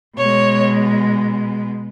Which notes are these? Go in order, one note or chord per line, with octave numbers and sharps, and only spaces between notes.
B2 G#3 C#5